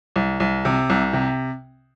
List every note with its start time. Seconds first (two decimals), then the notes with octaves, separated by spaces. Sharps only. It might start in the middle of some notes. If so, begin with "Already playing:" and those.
0.16 C2
0.40 C2
0.65 C3
0.90 C2
1.13 C3